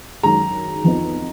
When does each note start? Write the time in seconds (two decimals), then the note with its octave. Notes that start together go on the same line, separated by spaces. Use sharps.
0.23 F#2 D#3 G#3 A#5
0.84 F2 F3 B3 D#4